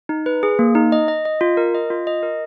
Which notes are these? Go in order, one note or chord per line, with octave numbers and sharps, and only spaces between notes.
D#4
B4
G#4
A#3
D#4
D#5
D#5
D#5
F4
A#4
D#5
F4
D#5
A#4